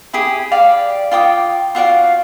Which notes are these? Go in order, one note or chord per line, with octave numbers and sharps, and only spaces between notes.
E4 G4 G#4
G4 D5 F5
F4 G5 D6 D#6
F4 F#4 D5 F5